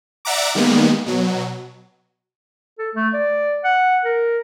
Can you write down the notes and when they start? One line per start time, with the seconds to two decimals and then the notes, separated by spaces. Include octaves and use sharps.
0.25 D5 E5 F#5 A#5 D6
0.55 D#3 G3 G#3 A#3 B3
1.06 B2 F#3
2.78 A4
2.95 A3
3.14 D5
3.64 F#5
4.05 A#4